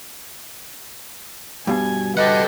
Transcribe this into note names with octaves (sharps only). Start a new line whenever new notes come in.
G2 B2 G#5
G4 A4 B4 D#5 F#5